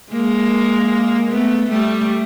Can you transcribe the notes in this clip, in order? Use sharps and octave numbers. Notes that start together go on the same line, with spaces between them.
G#3 A#3
A3 B3
G3 A3